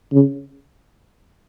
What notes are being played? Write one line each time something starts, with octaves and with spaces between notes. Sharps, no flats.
C#3